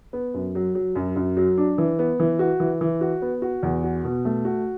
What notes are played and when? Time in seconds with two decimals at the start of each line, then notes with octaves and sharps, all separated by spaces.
0.13 B3
0.34 F#2
0.55 F#3
0.75 F#3
0.95 F#2
1.16 F#2
1.37 F#3
1.57 D4
1.78 E3
1.99 B3
2.20 E3
2.39 F#4
2.60 E3
2.81 E3
3.01 F#4
3.22 B3
3.42 F#4
3.63 E2
3.84 F#4
4.04 B2
4.25 A3
4.45 F#4